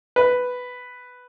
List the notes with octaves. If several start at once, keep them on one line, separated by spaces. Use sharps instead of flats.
B4